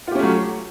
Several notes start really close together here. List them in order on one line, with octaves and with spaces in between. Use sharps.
F4 G4 C#4 A3 F#3